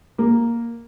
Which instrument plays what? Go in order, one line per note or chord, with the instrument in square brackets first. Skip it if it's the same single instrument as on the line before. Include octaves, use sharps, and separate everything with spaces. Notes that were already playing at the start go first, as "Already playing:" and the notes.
[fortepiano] A#3